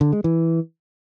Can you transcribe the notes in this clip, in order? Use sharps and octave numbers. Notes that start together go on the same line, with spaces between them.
D3
G#3
E3